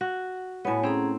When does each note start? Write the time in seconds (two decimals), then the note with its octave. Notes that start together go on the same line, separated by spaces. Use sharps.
0.01 F#4
0.65 A2 B3 C#5 G#5
0.83 C4 C#4 G#4 A#5